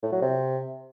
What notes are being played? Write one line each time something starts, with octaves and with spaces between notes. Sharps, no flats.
A2
F#3
C3